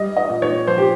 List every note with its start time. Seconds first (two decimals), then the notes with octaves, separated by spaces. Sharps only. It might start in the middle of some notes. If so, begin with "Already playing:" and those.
Already playing: G3 D#5
0.17 D#5
0.29 A#2
0.42 C#5
0.67 F3 C5
0.78 G4